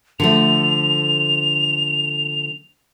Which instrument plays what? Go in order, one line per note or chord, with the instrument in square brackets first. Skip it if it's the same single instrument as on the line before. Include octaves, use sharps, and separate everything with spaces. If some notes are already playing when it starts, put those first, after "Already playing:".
[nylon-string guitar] D3 F3 A3 [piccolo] F7